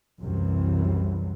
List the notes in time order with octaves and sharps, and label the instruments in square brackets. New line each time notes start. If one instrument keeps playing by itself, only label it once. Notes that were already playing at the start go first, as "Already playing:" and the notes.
[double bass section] C2 F#2 C3 E3